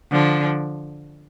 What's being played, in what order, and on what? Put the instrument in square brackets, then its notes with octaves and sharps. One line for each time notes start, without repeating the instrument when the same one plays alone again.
[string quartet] D3 F3